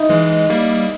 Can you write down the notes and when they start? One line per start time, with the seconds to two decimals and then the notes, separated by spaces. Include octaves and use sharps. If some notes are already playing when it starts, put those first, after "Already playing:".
Already playing: D#4 E4
0.09 E3 G#3
0.50 G3 A#3